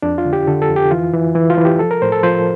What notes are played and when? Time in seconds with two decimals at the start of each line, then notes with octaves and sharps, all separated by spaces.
0.02 F2 D4
0.18 F4
0.25 D3
0.33 G4
0.47 D3 A4
0.62 A4
0.69 F2
0.76 G4
0.91 E3 F4
1.13 E3
1.35 E3 E4
1.50 F4
1.58 E3
1.65 G4
1.79 F3 A4
1.91 A#4
2.02 A2 C5
2.12 A4
2.23 F3 C5